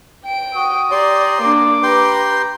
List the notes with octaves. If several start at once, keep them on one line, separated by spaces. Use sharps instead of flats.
G5 D7
F#4 D#6
G4 D5 A#5 C6
A#3 D4 D6
G4 B4 G5 A#5 C6